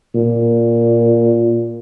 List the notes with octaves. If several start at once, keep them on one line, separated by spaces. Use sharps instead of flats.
A#2